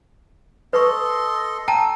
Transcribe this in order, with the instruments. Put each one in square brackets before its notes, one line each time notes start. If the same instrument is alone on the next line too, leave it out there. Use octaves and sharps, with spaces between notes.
[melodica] A4 D#5 C6 [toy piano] B4 C#6
[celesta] G5 A5 A#5 [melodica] E6